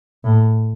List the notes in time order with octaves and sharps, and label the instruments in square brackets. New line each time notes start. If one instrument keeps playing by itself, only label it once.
[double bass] A2